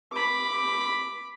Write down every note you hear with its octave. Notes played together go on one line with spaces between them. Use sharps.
B5 D6